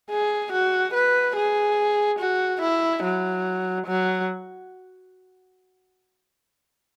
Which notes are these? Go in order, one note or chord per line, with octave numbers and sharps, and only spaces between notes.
G#4
F#4
B4
G#4
F#4
E4
F#3
F#3